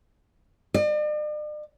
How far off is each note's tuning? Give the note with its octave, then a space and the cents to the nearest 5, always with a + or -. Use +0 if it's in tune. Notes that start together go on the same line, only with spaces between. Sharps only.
D5 +45